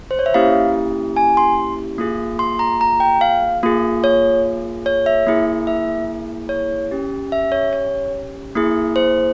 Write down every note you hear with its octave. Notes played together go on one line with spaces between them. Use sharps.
C5
C#5
E5
A#3 C#4 E4 G4 F5
G#5
C6
A#3 F4 G#4
C6
A#5
A#5
G5
F5
A#3 F4 G#4
C#5
C#5
E5
A#3 E4 G#4
E5
C#5
C#4 G4
E5
C#5
C#5
A#3 E4 G#4
C5